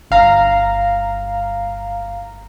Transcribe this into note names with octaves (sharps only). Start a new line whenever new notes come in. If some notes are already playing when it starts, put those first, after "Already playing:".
G1 F5 A#5